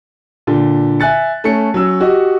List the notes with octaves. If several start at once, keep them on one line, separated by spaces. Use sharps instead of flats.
A#2 D3
E5 G#5 F#6 A6 C#7
A3 C#4 C#7
F#3 C#4 E6
F#4 G4 D#5